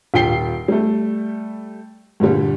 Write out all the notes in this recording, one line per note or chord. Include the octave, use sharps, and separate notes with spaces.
D#1 F4 G5 C7 G7
G3 A3
G2 A#2 D3 G3